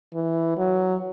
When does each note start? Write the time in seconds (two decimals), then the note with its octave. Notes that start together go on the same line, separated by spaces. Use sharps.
0.14 E3
0.57 F#3